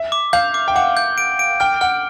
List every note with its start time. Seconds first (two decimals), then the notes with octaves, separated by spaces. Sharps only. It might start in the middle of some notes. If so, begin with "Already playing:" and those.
Already playing: E5
0.12 D6
0.33 F5 G6
0.54 D6
0.68 G5
0.75 F#5 D6
0.97 G6
1.18 D7
1.39 D7
1.60 G5 F6
1.81 F#5 F6